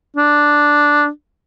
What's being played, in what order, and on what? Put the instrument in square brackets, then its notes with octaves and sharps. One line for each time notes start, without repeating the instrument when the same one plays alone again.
[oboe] D4